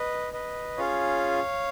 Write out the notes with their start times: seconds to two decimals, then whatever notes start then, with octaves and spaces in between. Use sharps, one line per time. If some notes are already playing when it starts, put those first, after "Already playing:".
Already playing: B4 D#5
0.33 B4 D#5
0.77 C#4 F4 G#4 C#5 F5